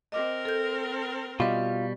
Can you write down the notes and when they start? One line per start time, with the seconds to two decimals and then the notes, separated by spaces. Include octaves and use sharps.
0.12 C4 A#4 D#5 D6
0.45 A4 G6
1.40 B2 G3 F4 D#5 D6